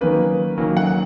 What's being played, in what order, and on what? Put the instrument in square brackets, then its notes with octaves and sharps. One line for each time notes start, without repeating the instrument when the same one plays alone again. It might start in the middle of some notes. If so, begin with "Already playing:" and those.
[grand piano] D#3 F#3 A#3 C#4 B4
D#3 F#3 A#3 C#4
F#5